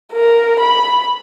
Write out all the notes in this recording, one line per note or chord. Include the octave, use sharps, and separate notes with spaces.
A#4
B5